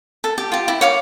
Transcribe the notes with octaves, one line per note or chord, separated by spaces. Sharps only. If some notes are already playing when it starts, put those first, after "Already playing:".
A4
G4
F4 G4
E4
C#5 F5 D6